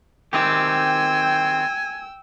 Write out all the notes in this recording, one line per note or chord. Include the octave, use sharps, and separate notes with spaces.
D#3 C4 G4 G5 G#5 E6